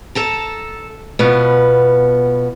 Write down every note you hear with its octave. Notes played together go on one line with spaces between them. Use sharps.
A4 A5 A#5
B2 F3 B3